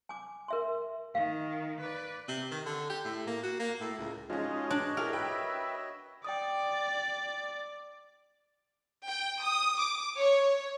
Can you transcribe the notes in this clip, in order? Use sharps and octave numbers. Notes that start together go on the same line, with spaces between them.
G#5 D6
A#4 E5 C6
D#3 F5
B4 D5
C3
D#3
D3
G4
A2
A#3
F#4
A#3
A2
C#2
F3 G#3 C#4 D#4 F4 F#4 C#5 D#5
D4
D4 E4 G4 G#4 A#4
B4 E5 G5 F#6
D5 G5 D#6
G5
D#6
D6
C#5